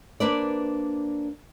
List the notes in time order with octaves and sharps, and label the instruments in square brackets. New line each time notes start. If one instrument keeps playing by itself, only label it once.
[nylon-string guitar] A#3 D4 B4 C5 D5